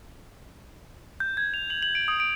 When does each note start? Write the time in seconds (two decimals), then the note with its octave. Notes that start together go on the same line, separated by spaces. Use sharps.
1.20 G6
1.37 G#6
1.54 F7
1.70 F#7
1.82 F#7
1.95 D7
2.08 D#6
2.20 D7